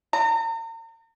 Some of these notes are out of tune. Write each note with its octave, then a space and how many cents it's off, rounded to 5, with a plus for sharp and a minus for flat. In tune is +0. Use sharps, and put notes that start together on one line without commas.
A#5 -40